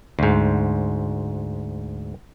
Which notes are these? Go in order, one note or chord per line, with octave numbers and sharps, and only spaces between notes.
D2 G#2